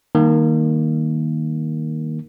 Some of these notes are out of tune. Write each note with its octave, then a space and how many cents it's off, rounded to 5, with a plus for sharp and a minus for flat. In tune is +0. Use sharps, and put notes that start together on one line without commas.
D#3 +0 G3 +0 A#3 +0